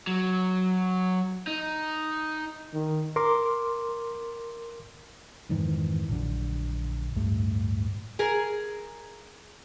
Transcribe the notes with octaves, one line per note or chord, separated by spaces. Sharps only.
F#3
D#4
D#3
A#4 C6 D6
F2 G#2 D#3 E3
A#1 F#2 D3
D1 G2 A3
G#4 A#4